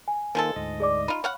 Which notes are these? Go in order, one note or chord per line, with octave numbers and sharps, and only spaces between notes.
G#5
D#3 F3 G#3 A#3 A4
D2 G#2 D#5
G#4 D5 D6
D#4 F4 B5
C#5 F5 F#5